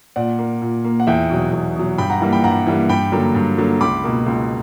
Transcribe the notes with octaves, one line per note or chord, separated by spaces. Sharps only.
A#2 D5 F#5
A#3
A#2
A#3
F#5
E2 E5 G5
B2 F#3
E2
B2 F#3
G2 G5 B5
F#5 A#5
E3 G3 A#3
G5 B5
G2 F#5 A#5
E3 G3 A#3
G2 G5 B5
D3 F#3 A#3
G2
D3 F#3 A#3
C#2 B5 D6
B2 A#3
C#2